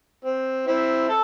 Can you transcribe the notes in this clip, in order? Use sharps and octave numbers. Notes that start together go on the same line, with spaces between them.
C4
C4 E4
A4